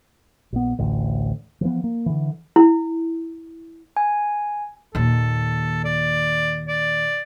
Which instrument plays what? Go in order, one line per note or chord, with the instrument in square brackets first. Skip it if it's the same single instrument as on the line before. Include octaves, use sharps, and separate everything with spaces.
[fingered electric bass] A#1 B3
A1 D2
E3 F3 B3
A#3
D3 E3
[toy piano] E4
[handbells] G#5
[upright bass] D#2 A#2 [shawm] A4
[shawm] D5
D5